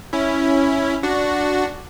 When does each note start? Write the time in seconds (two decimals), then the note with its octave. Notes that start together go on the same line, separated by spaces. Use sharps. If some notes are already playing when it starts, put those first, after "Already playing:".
0.13 C#4 E4
1.03 D4 F#4